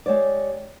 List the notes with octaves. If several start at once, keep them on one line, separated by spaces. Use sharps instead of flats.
G#3 G4 C#5 D5